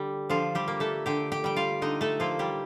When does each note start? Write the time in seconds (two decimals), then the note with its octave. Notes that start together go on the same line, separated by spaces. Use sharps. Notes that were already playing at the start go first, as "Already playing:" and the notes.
Already playing: D3 G3 G4
0.29 D3 F3 F4
0.55 G3 G4
0.68 A#3
0.80 A3 A4
1.06 D3 G4 G5
1.32 G4 G5
1.44 G3 G5
1.56 F4 F5
1.82 D3 D#4 D#5
2.01 A3 A4
2.20 F3 A#3 F4
2.39 G3 G4